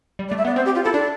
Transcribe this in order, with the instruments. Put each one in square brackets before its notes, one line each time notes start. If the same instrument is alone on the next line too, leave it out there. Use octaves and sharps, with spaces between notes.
[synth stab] G3
[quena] D5
[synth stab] A3
[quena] E5
[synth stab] B3 [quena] D5
[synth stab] C4 [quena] C5
[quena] G4
F4
[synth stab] E4 [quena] A4
[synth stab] D4 [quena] D5